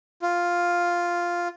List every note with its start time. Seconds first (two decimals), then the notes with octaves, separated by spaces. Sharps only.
0.22 F4